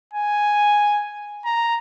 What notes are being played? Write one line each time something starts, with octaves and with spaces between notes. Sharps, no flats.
G#5
A#5